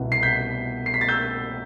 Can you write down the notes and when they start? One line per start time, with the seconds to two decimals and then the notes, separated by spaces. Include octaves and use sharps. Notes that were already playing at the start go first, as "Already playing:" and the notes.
Already playing: C2 B2 B3 E4
0.12 C7
0.23 G6 B6
0.86 C7
0.94 B6
1.01 A6
1.08 E6 G6